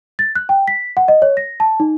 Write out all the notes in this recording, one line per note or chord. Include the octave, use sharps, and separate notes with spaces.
A6
F#6
G5
B6
F#5
D#5
C#5
A#6
A5
D#4